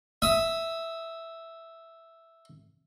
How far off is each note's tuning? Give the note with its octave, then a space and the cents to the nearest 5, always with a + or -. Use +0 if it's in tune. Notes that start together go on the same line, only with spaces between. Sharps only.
E5 +0 D#6 +25